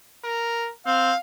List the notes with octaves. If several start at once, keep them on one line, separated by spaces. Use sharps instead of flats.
A#4
C4 F5